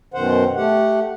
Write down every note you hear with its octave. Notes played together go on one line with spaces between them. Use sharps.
F#2 B2 D#3 C5 F#5
A3 G4 F#5